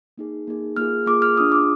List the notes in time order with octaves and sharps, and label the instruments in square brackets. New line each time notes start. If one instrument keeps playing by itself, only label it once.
[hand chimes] A#3 D#4 G#4
A#3 D#4 G#4
A#3 F4 G#4 F6
A#3 F4 G#4 D6
F6
D4 F4 G#4 D#6
D6